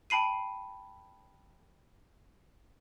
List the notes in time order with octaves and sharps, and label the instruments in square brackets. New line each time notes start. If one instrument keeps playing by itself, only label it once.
[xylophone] G5 A5 B5 C7 D#7